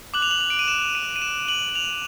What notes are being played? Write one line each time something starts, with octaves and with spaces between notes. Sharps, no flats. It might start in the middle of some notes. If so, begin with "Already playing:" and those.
D6 F#6 F#7
F7
F#7
F7
D7
D#7
E7
D#7
D#7
E7
F#7
F7